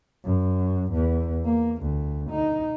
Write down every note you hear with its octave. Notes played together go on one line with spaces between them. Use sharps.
F#2
E2
A#3
D2
D#4